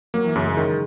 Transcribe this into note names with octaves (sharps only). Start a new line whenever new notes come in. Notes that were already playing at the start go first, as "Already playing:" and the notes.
F#3 A#3
E3
F#2 C#3
G#3
D#3 G#3